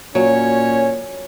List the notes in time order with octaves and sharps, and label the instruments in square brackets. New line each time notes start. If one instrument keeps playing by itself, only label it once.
[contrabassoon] A#2 [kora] F#3 [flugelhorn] C#4 [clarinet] C#5